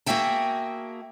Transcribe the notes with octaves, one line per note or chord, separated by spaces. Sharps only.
A#3 F#4 G#4 E5 G5 A5